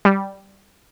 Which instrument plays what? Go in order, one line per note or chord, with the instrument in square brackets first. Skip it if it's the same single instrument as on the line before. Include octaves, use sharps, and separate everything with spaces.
[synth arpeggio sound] G3